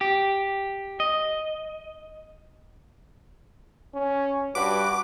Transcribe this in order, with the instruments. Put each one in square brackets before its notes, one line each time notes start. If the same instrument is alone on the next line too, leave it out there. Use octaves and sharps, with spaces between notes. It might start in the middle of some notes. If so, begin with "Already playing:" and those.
[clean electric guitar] G4
D#5
[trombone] C#4
[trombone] G2 [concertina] F#4 B4 [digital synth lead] D6